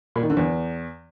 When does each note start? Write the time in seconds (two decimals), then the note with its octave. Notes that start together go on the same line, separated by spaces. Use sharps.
0.16 A#2
0.23 D#3
0.30 D3
0.37 E2